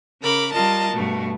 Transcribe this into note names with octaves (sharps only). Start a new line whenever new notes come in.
C#3 A#4 B5 D6
G3 F4 A#4 D#5 A5
G2 B2 A3